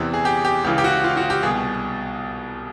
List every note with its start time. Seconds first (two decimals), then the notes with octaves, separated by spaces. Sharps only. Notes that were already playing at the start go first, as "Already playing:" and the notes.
Already playing: E2 C3 E3
0.14 G#4
0.25 G4
0.45 G4
0.64 C#2 C#3 E3 G4
0.78 G4
0.84 F#4
1.04 F4
1.17 F#4
1.30 G4
1.43 C2 B2 G#4